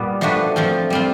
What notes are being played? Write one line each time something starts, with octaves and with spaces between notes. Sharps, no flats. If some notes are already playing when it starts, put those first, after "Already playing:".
Already playing: A#2 G3 B3
F3 A3 D4 F#4 B4
F3 A3 C4 F4
G3 C4 F4